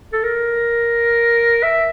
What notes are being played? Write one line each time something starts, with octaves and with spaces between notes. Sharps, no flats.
A4
A#4
E5